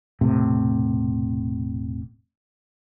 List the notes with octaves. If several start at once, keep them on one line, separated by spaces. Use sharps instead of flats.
E1 A2 C3